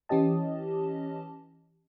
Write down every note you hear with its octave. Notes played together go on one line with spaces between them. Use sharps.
E3 C#4 G4 D#5 A5